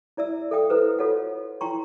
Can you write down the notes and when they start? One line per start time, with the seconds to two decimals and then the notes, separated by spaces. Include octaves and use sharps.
0.17 E4 D5 E5 E6
0.51 A4 E5 F5 G5 D#6
0.70 E4 A4 B4 C5
0.99 F4 F#4 A4 C#5 D#5 F#5
1.61 E4 F4 G5 A#5 C6 C#6